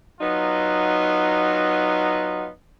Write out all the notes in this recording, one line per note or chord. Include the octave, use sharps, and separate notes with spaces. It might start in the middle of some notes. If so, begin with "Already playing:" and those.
F#3 B3 D#4 F4